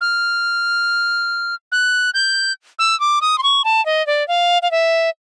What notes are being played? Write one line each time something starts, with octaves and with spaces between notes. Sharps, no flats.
F6
F#6
G6
E6
D6
D#6
C6
C#6
A5
D#5
D5
F5
F5
E5